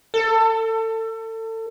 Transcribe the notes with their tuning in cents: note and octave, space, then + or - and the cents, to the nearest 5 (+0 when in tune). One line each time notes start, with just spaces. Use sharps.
A4 +30